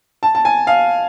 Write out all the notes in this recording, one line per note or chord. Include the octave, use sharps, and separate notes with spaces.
A5
A5
G#5
F5